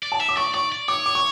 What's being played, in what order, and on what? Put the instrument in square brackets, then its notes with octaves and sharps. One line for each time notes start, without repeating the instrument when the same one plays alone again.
[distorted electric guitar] D5
[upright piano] A5
[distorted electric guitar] E5
[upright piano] D6
[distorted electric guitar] D5 [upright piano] C#6
[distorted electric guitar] D5 [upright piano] C#6
[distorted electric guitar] D5
[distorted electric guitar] C#5 [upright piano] D6
[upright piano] D6
C#6